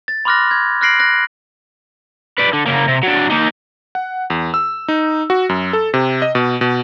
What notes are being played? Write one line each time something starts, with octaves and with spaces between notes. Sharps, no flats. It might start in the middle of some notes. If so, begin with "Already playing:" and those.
A6
B5 C6 D6 F6 F#6 A#6
G#6
F6 F#6 A#6 C7 D7 F#7
F#6 A#6
B4 D5
D3
C#3 A#3
C3
F#3 D4
A#3 D#4
F#5
E2
E6
D#4
F#4
F#2
A4
C3
D#5
B2
B2